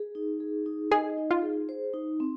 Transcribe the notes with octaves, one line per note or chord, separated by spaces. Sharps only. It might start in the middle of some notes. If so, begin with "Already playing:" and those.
Already playing: G#4
D#4
G#4
D#4
G#4 D#5
D#4
F4
G#4
C5
D#4
C4